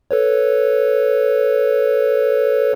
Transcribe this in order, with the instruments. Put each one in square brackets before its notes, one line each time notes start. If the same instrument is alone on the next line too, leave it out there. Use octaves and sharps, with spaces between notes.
[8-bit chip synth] A4 B4 C#5